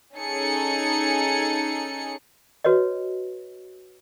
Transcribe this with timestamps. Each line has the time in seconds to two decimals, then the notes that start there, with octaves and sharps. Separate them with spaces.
0.15 C#4 D#4 G#4 A4 C#7
2.64 F#4 B4 C#5 D#5